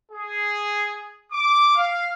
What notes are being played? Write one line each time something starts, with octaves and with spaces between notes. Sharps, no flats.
G#4
D6
F5